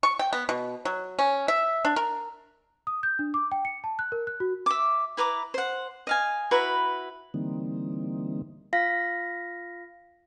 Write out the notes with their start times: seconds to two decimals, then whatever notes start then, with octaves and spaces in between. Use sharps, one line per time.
0.03 C#6
0.19 G5
0.33 B3
0.49 B2
0.85 F#3
1.19 C#4
1.48 E5
1.85 D4
1.96 A#4
2.87 D#6
3.03 G6
3.19 D4
3.34 D6
3.52 G5
3.65 C#7
3.84 A5
3.99 F#6
4.12 A#4
4.27 F#6
4.40 F#4
4.66 E5 D6
5.17 E4 B4 A#5 D6
5.54 C5 F#5
6.07 D#5 F5 G#5
6.51 E4 F#4 B4 A#5
7.34 D3 E3 G3 A#3 C4 D#4
8.73 F4 F5 A#6 B6